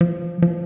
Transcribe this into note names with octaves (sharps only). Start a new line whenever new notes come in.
F3
F3